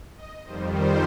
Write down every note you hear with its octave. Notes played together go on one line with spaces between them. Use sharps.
D#5
F2 D#3 G3 C5
C5